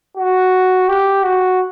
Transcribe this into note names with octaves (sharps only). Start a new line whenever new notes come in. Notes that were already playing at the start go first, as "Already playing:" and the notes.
F#4
G4
F#4